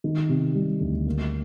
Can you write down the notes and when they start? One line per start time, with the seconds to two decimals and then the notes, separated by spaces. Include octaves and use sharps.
0.04 D#3
0.29 C3
0.55 G3
0.80 D2
1.06 A#3